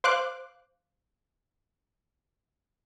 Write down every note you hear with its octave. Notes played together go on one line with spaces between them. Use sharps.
C5 F5 D6 F#6